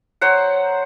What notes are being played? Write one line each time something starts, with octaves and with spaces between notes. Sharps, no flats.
F#3 C5 F#5